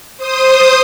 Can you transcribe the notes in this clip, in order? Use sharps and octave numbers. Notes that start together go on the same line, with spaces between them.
C5 D#6